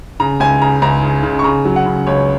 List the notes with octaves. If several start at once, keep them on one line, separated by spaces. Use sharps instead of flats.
C#3 A#5
C#2 G#5
C#3 A#5
C#2 A#5
C#3
C#3
C#6
C#3 A#5
F#3
F#5
C#3
C#2 C#5